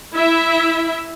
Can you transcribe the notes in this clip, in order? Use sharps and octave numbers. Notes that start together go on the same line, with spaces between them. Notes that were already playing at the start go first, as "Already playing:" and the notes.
E4 E5